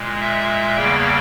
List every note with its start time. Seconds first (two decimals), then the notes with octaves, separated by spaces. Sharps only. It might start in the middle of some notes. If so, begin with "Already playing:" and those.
Already playing: A#2 G#3
0.21 E5
0.76 E2 C#3 G3 A#3 G5